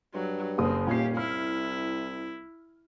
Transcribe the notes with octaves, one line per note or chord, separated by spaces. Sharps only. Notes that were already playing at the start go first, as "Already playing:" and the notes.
G2 F#3
F#1 A#3 C4 D#6
D#1 A#2 C#4 G4 G#6 C7
C2 E4 F6